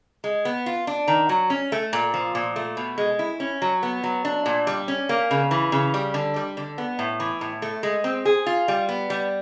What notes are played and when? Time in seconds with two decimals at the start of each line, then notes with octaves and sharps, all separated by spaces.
0.24 G#3
0.45 B3
0.66 F4
0.87 D4
1.08 D#3
1.29 F#3
1.50 C#4
1.72 A3
1.93 A#2
2.14 F3
2.35 A#2
2.56 A3
2.77 B2
2.98 G#3
3.19 E4
3.40 C#4
3.62 F#3
3.83 B3
4.04 F#3
4.25 D4
4.46 A#2
4.67 G3
4.88 C#4
5.09 A#3
5.31 C#3
5.51 E3
5.72 C#3
5.94 G3
6.14 D3
6.36 G3
6.57 D3
6.78 B3
6.99 A2
7.20 E3
7.41 A2
7.62 A3
7.83 G#3
8.04 C4
8.25 G#4
8.46 F4
8.68 G3
8.89 B3
9.10 G3